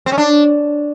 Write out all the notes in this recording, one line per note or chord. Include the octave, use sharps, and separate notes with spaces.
C4
C#4
D4